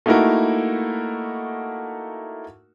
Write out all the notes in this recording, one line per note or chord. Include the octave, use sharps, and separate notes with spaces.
A3 A#3 D#4 E4 F#4 A#4